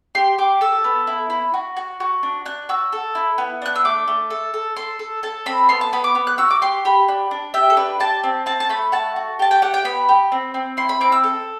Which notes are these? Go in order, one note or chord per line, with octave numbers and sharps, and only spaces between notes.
G4 C6
G4 D6
A4 E6
B3
E4
E4
F#4
F#4
F#4
D4
D4 F#6
F#4 E6
A4
E4
B3
D4 F#6
E6
A3 D6
A3
A4
A4
A4 C6
A4
A4 A5
C4 B5
B3 C6
A5
B3 B5
D6
B3
F#6
F#4 E6
D6
G4 C6
G4 B5
D4
D4
G4 E5
A4
D4 B4
G4 A5
C4
C4 A5
A5
A3 B5
F#4 A5
F#4
G4 A5
G5
G4 F#5
G5
B3 B5
G4
C4
C4
E4 C6
B5
C4 D6
E6
A4